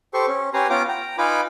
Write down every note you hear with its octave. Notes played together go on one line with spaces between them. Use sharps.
G4 A4 C5 C6 C#6
C#4
C#4 G4 B4 G#5 A#5 C6
B3 C#4 F4 G5 A#5 D6
G5 A#5
D#4 F4 B4 G#5 B5 D6